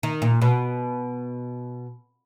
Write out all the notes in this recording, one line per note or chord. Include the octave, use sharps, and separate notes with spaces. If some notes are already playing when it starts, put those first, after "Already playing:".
D#3
A#2
B2